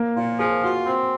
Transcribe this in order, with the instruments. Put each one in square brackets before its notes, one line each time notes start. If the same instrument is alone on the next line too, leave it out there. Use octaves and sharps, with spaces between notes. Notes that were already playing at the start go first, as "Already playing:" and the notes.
Already playing: [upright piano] A#3
[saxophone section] A#2 [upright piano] F4
[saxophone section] F3 [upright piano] G#4
[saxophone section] F4 [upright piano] F#4
[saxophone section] C4